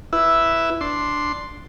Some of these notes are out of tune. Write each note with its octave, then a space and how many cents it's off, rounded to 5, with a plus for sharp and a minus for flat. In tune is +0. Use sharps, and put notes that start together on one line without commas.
E4 +0 B4 +0 E5 +0
D4 +0 C6 +0